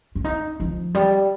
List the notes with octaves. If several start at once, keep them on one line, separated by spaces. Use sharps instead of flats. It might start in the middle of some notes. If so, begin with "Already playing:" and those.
D4
D#4
F3
G3